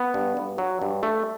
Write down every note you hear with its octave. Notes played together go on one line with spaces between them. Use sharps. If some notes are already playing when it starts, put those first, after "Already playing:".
Already playing: B3
G2
G2
F#3
G2
A3